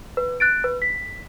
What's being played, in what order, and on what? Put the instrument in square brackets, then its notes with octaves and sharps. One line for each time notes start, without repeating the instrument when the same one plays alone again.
[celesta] B4
F#6 A6 D7
B4
B6